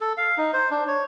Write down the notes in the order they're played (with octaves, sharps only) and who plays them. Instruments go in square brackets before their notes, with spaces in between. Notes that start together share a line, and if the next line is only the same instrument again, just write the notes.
[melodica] A4
F5
D#4
C5
D4
C#5